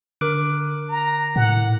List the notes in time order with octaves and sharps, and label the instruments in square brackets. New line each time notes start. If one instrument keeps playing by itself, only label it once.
[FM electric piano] D3 F#6 [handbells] A#4 D6 D7
[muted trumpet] A#5
[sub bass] A2 [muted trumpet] F#5